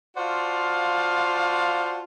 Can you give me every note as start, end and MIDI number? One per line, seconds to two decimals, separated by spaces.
0.17 2.02 65
0.17 2.02 66
0.17 2.02 72
0.17 2.02 74
0.17 2.02 77
0.17 2.02 81